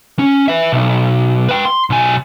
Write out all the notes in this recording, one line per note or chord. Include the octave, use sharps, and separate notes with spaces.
C#4
B4 E5
B1
B4 G5
C6
B1 G#5